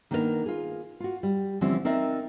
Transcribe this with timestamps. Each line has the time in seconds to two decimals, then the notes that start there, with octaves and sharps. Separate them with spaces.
0.11 D#3 A#3 B3 D4 E4 A#4
0.46 F4 G#4
1.00 F4 F#4
1.23 G3
1.61 D3 E3 F3 G3 C4 C#4
1.85 C4 D#4 A#4 D5 E5